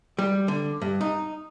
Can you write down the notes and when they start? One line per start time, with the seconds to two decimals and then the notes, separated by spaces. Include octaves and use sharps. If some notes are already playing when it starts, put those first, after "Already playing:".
0.19 G3
0.48 D3
0.82 G2
1.01 D#4